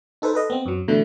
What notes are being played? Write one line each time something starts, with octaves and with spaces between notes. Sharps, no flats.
D#4 A4 B4 C5
A4 B4 D#5
B3 C4
F#2 F#3
B2 D3 E3 A3 E4